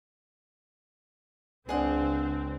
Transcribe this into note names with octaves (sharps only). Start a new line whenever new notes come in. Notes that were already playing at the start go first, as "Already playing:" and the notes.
C#2 C#3 C4 D4 G#4 D5 F#5